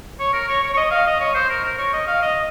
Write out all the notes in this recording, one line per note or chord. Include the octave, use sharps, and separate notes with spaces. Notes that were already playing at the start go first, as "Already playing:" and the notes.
C#5
A#4
C#5
C#5
C#5
D#5
F5
D#5
C#5
C5
A#4
A#4
C#5
D#5
F5
D#5